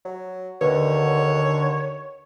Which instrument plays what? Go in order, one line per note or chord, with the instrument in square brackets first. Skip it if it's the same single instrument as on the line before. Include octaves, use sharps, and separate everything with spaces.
[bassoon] F#3
[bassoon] D#2 [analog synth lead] D3 [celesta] B4 [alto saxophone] C#5